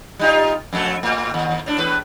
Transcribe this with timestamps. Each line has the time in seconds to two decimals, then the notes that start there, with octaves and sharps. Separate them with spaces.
0.19 G3 D#4 F4
0.73 F2 A3
1.03 A2
1.34 D#2
1.66 A2 D4
1.78 E2 A2 B4